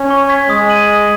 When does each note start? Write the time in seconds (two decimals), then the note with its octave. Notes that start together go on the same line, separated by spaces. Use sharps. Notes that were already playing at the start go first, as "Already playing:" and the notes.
Already playing: C#4
0.10 C#6
0.29 G#6 B6
0.49 G#3 D#6
0.70 G#6 D#7 F#7
0.88 D#6